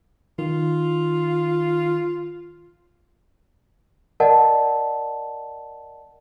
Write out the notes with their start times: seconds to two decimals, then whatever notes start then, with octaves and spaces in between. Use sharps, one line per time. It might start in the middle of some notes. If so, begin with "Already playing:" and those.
0.39 D#3 F4
4.20 A#4 D5 D#5 F#5 A5